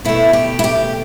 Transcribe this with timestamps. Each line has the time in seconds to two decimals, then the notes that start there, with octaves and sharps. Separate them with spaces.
0.05 B2 A3 E4
0.33 G4
0.59 E4
0.64 G4